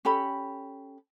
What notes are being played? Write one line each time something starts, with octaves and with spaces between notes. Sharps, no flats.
C#4 G4 A4 B5